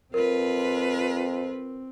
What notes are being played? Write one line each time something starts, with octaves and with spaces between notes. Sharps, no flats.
F2 C4 F4 A#4 B4